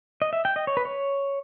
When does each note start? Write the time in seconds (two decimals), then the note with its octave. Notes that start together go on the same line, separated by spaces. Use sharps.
0.22 D#5
0.33 E5
0.45 G5
0.56 D#5
0.67 C#5
0.77 B4
0.85 C#5